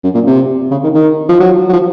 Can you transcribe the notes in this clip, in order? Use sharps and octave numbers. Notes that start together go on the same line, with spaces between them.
F#2
A#2
C3
C#3
D#3
D#3
F3
F#3
F#3
F3